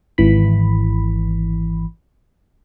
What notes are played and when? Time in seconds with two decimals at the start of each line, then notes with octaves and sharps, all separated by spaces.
0.18 G#1 E3 B5